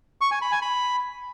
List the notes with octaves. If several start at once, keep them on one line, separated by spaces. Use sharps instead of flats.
C#6
G#5
B5
G#5
B5